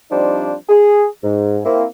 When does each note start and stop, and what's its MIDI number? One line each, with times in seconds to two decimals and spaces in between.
0.11 0.53 53
0.11 0.53 55
0.11 0.53 60
0.11 0.53 62
0.11 0.53 63
0.11 0.53 72
0.69 1.06 68
1.23 1.59 44
1.65 1.84 58
1.65 1.84 60
1.65 1.84 64